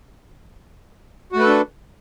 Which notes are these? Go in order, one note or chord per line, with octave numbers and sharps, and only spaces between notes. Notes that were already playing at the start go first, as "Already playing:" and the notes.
A3 D4 F#4 A4 B4